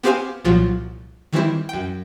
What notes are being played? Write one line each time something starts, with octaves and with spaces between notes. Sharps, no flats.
B3 C4 G4 C5 F5 G#5
C2 A#2 F3 F#3
D#3 E3 G3 C4 E4
F#2 G5